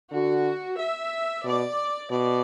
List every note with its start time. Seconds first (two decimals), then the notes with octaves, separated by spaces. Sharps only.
0.12 D3 F#4
0.78 E5
1.44 B2 D5
2.11 B2 D5